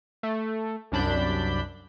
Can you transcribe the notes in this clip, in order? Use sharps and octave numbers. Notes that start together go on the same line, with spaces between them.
A3
C2 F#2 D4 B5 G6